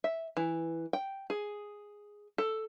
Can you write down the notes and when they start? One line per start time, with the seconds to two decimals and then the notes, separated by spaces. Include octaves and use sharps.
0.04 E5
0.37 E3
0.93 G5
1.30 G#4
2.38 A4